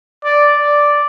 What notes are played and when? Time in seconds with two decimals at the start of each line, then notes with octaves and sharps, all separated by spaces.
0.24 D5
0.57 D5